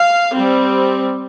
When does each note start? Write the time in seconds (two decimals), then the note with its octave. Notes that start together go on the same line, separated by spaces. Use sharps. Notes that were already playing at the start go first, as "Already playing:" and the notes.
Already playing: F5
0.36 G3 C4